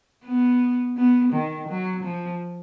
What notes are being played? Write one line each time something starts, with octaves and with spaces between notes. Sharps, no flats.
B3
B3
D#3
F#3
F3